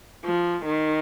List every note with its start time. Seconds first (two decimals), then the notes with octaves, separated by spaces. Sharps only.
0.25 F3
0.65 D#3